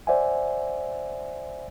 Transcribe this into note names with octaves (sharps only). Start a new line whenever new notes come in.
C5 D5 E5 F#5 G#5